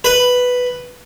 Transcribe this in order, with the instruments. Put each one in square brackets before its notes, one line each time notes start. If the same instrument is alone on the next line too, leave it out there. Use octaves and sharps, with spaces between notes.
[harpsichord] B4